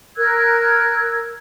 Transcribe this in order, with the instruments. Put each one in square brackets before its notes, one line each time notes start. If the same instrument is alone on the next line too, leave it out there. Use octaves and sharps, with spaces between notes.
[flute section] A#4 E6 F#6 G#6